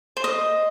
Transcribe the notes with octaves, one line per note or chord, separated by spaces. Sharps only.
C5
D#5